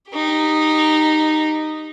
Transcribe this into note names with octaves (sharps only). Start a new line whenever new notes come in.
D#4 G4